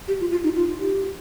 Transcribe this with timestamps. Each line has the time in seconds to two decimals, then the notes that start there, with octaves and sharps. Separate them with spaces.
0.08 G4
0.20 F4
0.31 F4
0.44 D#4
0.55 F4
0.79 G4